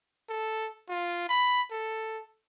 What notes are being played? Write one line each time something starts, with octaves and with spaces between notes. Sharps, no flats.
A4
F4
B5
A4